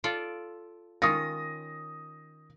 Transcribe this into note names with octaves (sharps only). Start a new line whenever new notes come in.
F4 A4 D5
D#3 C#4 F4 D#6 A#6